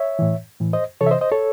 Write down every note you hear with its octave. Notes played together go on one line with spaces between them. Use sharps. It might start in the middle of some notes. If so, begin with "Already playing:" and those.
Already playing: C#5 E5
A2 E3
A2 E3
C5 D#5
C3 E3 A4 C#5
E5
C5 D#5
C5 D#5
A4 C#5